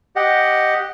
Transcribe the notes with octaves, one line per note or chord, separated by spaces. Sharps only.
G4 D#5 F#5